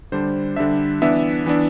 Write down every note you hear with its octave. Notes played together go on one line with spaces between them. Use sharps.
D3 G3 D4 C5
D3 G3 D4 E5
E3 B3 D4 E5
E3 B3 D4